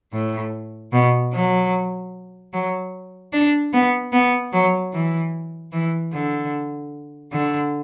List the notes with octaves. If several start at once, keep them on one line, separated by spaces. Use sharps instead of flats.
A2
B2
F#3
F#3
D4
B3
B3
F#3
E3
E3
D3
D3